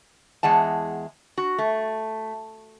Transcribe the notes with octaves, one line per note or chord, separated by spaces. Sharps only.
E2 G#3 F#5 A5
F#4
A3